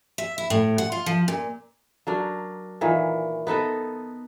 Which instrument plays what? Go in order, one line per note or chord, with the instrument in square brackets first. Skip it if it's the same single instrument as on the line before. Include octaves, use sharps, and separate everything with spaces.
[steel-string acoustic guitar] E5
E4
A2
F#5
F4
F3
A#2
[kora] F#3 D4 A#4
A#2 D#3 E3
B3 D#4 A4 B4